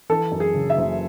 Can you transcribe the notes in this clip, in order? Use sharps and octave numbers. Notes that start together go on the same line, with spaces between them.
E3 A4
F#2
G#4
C#3
E5
F#1